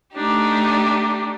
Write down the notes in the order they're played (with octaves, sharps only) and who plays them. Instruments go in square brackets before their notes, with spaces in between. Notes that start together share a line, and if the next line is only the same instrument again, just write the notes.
[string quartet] A3 D4 D#4 G4